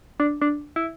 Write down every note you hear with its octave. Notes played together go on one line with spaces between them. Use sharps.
D4
D4
E4